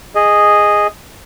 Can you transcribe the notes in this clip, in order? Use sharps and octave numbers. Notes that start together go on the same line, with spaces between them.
G#4 D#5